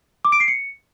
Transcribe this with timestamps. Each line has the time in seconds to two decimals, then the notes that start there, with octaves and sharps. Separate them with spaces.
0.25 D6
0.32 D7
0.40 C7
0.48 C#7